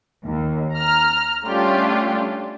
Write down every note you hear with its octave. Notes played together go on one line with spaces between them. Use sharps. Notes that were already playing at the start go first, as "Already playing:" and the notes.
D#2
A#5 F6
G3 A3 C#4 D4 F4 G4